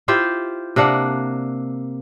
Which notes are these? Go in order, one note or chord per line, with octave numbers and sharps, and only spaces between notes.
E4 F4 G4 C5
C3 A#3 D4 F#5